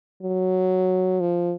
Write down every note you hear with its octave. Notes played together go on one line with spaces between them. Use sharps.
F#3
F3